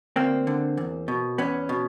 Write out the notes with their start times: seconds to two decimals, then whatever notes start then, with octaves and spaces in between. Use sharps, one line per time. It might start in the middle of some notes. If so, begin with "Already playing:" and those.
0.16 D2 A#3 C4
0.47 D3
0.77 E2
1.08 B2
1.38 E2 B3 C#4
1.69 B2